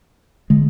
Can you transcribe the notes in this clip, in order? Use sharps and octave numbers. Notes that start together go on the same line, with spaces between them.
D3 G#3